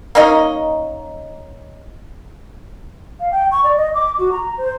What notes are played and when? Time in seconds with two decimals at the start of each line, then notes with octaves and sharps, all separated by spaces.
0.15 A#3 C#4 D#4 D#5
3.20 F5
3.32 G5
3.51 C#6
3.64 D5
3.77 D#5
3.94 D6
4.18 F#4
4.32 A#5
4.58 C5